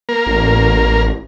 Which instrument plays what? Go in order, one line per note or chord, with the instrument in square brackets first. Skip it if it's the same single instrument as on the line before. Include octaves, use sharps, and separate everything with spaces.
[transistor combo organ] A#3 A#4
[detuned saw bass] A1